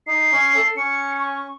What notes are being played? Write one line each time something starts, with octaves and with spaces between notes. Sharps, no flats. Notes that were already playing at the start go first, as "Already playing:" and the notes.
D#4 C7
C#4
A4
C#4 C#7
C#6